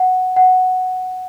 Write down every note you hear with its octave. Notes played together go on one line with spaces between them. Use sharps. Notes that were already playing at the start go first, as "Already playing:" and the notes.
Already playing: F#5
F#5